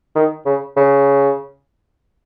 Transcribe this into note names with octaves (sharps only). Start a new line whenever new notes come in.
D#3
C#3
C#3